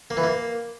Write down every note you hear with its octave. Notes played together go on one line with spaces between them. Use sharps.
A#3
E3
A#3